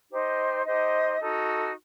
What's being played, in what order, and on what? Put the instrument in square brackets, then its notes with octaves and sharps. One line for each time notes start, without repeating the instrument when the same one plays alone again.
[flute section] D#4 G4 C5 D#5
D#4 G4 C5 D#5
D#4 F#4 A4